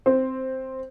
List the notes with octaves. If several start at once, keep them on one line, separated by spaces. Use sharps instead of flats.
C4